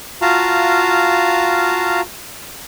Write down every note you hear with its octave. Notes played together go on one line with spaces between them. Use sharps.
F4 F#4 F5 A5 A#5